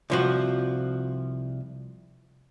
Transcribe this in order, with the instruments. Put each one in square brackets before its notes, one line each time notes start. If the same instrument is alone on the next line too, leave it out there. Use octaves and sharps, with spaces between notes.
[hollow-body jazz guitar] C2 F3 F#4